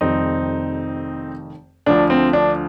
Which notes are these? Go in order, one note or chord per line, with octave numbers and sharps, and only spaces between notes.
F1 F2 D#3 G3 C4 D#4
D2 D3 F3 D4
C4
D4